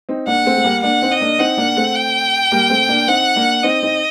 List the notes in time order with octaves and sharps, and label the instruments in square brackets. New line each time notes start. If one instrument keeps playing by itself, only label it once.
[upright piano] C4 D#4
[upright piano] A#3 D4 [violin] F#5
[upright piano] A3 C4
A3
G3 A#3
[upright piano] A#3 D4 [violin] F#5
[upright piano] C4 D#4
[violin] D#5
[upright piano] A#3 D4
[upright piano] C4 D#4 [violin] F#5
[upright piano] A#3 D4
A3 C4
[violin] G5
[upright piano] G3 A#3
A3 C4
A#3 D4
[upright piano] C4 D#4 [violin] F#5
[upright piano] A#3 D4
[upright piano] C4 D#4 [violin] D#5
[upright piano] C4 D#4